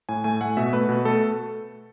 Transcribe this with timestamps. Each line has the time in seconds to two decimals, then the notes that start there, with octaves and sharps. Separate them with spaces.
0.09 A2 G#5
0.24 A3 G#5
0.41 A3 F#5
0.57 B2 E5
0.73 A3 B4
0.89 B2
1.05 A3 A4